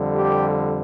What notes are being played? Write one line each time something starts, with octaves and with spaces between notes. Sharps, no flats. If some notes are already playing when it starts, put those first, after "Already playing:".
Already playing: F2 D3 G3
G4